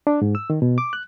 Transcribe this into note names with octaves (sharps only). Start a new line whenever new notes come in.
D4
G#2
E6
D#3
B2
D6
F#6